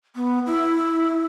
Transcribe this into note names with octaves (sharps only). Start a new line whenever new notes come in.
B3
E4